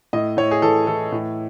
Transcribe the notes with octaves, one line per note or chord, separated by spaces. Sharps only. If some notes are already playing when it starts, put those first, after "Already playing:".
A2 D#5
A2 C#5
G#4
E3 A4
E3 A4
A2